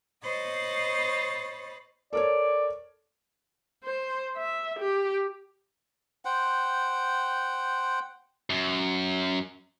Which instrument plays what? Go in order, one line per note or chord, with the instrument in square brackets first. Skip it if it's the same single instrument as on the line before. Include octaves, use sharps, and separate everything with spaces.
[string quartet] C5 C#5 D#5 B5 A6
[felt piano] A4 A#4 C#5 [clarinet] D5
[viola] C5
E5
G4
[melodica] C5 F#5 G5
[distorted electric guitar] F#2